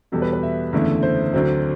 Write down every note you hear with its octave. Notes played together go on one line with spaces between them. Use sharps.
E2 B2 G3 A4
B4
B4
E5
F#1 E2 D3 A3 E4
C5
D2 D3 F#3 C4